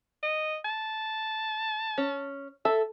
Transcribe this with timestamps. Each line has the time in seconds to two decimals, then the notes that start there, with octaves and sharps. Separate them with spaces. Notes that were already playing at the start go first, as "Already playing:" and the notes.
0.23 D#5
0.65 A5
1.98 C#4
2.65 A4 E5